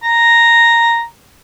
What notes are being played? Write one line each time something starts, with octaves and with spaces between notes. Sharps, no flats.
A#5